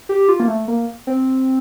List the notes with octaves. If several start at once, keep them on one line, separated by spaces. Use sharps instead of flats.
G4
F4
A#3
A3
A#3
C4